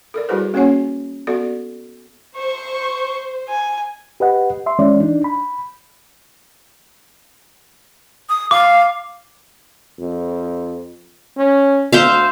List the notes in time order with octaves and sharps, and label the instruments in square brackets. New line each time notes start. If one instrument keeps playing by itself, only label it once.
[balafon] A4 A#4 D5
G3 E4 F#4 G#4 B4 C5
A#3 C#4 F#4 C#5 F#5 G#5
B3 F#4 A4 D5
[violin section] C5 [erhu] C#6
[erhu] G#5
[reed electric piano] G4 B4 D#5 F#5
E5 C6
E3 G#3 C#4 D5
D4 D#4
B5
[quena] D#6
[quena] F5 [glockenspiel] D6
[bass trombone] F2
C#4
[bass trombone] D2 [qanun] C5 E5 F5